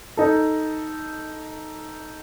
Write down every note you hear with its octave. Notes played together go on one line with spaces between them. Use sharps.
D#4 A4